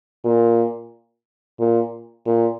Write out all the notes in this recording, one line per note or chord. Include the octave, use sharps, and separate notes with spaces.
A#2
A#2
A#2